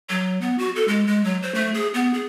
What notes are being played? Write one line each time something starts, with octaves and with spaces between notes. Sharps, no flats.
F#3
B3
F#4
A4
G#3
G#3
F#3
C5
A3
G#4
B3
G#4